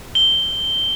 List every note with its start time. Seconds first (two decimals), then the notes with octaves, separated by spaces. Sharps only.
0.15 G7